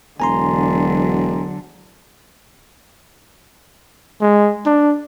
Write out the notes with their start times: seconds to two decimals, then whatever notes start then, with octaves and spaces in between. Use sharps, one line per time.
0.20 E1 D3 F#3 G#5 A#5 C6
4.21 G#3
4.66 D4